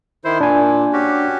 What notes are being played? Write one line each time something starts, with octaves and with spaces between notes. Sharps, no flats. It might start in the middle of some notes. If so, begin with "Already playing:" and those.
D#3 E4 C5
A#2 D4 G#5
C#4 F#4 G4